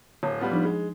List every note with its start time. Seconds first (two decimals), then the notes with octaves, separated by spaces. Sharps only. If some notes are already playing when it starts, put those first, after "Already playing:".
0.23 D1 C#5
0.40 G3 B3 F4
0.51 F3 D4 D#4
0.65 G#3